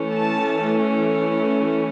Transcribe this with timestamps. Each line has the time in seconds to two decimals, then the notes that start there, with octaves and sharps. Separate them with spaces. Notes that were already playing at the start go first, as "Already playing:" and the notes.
Already playing: E3 A3 C#4
0.11 A5